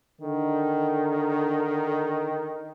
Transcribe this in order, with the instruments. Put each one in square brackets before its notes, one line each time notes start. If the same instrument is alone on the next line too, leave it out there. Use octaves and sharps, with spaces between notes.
[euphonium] D3 [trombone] D#3